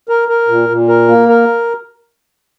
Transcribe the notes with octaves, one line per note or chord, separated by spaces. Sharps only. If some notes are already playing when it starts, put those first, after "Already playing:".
A#4
A#4
A#2
A#2
A#4
A#3
A#4